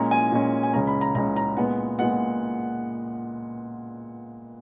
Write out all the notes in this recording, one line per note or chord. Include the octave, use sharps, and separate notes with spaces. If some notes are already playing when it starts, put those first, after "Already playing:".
Already playing: A#2 G#3 C#4 A#5
G#5
A#2 G#3 C#4
G#5
C#2 C#3 G#3 C#4 A#5
B5
A#5
C#2 C#3 G#3 C#4 A#5
A#5
A#2 G#3 B3 F#5
A#2 G#3 B3 F#5